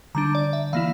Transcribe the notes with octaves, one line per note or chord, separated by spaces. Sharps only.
D3 G3 D4 A#5
D5
E5
E3 A#3 E4 F5